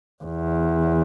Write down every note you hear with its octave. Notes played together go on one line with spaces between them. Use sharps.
E2